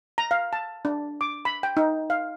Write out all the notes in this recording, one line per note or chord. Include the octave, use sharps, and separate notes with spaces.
A#5
F5
A5
D4
D6
B5
G5
D#4
F5